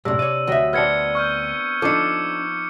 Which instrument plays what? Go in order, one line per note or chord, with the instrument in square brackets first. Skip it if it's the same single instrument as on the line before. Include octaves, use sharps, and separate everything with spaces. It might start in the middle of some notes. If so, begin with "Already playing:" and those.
[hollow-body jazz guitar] F#2 A2 [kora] C3 D4 [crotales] E6
[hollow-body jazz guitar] C#5 D5 [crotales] D#7
[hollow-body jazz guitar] D2 E5 [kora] F#3 D#5 G5
[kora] B3 C4 D4 [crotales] F6 G#6 C#7
[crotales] C#6 F6 G6
[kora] F3 D#4 [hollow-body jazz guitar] D4 A4 [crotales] D6 E6 C#7